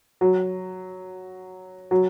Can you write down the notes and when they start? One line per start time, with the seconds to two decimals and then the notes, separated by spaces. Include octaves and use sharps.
0.21 F#3
1.91 F#3